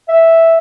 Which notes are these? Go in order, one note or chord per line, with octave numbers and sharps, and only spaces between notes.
E5